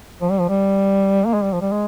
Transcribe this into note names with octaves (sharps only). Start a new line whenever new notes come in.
F3
G3
F3
G3
A#3
G#3
G3
F3
G3
G#3